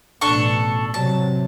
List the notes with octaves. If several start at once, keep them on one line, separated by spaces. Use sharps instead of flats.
A1 B2 D4 A4 C#6
C3 F#3 A5